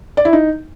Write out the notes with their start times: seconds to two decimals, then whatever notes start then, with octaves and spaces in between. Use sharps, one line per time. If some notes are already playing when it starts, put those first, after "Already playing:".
0.17 D5
0.25 E4
0.33 D#4